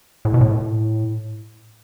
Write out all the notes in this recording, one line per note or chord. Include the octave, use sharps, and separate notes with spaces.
A2
B2
A2